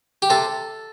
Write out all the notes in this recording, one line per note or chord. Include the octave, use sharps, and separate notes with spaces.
G4
C3 A4